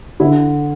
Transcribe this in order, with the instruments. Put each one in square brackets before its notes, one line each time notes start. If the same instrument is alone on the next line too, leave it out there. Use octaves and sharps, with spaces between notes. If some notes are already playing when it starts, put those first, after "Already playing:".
[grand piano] D3 [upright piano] E4